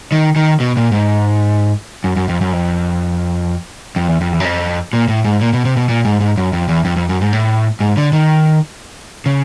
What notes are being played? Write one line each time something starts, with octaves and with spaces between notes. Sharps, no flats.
D#3
D#3
B2
A#2
G#2
F#2
F#2
F2
F#2
F2
F2
E2
F2
E2
F#2
F2
A#2
A2
G#2
A#2
B2
C3
B2
A#2
G#2
G#2
F#2
F2
E2
F2
F2
F#2
G#2
A2
G#2
D3
D#3
C#3